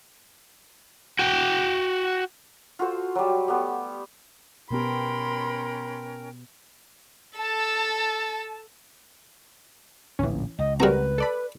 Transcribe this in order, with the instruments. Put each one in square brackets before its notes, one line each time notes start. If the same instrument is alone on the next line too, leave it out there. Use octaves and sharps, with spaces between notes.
[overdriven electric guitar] F#4 G5
[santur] F4 F#4 A4 C5
F#3 G3
G3 A3 B3
[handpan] B2 B3 G4 [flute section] C#4 A#4 G5 [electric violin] B5 C6
[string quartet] A4 E6 [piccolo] A5
[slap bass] D1 A#1 [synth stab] E3 C#4
[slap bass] C#2 [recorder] D#5
[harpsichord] G3 A#5 [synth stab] C4 F#4 A#4 [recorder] B4
[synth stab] A4 D5 B5